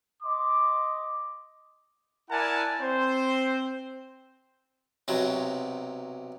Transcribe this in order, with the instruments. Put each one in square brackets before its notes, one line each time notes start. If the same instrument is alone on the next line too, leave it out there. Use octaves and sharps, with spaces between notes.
[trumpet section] D#5 C6 D6
E4 A#4 D5 F#5 G#5 A5
C4 C5
[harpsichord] B1 C3 F#3